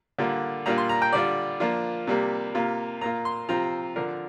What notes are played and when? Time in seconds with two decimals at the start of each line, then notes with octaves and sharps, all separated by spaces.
0.18 D3 G3 A#3 D4 F4
0.66 A#2 G3 A#3 D4 F4 A#5
0.78 C6
0.89 A#5
1.02 G5
1.13 D3 G3 D4 F4 D5
1.60 F3 A#3 D4 F4
2.07 C3 G3 A#3
2.55 C3 A#3 F4
3.01 A#2 A#3 F4 A#5
3.25 C6
3.49 C3 F3 C4 F4 A#5
3.96 D3 F3 D4 A#4